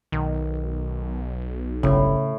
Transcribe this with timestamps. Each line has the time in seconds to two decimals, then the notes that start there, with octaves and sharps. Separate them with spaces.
0.12 B1 D#3
1.83 G1 A2 C#3